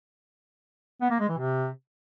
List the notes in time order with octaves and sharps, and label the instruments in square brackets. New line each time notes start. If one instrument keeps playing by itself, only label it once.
[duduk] B3
A#3
G#3
E3
C3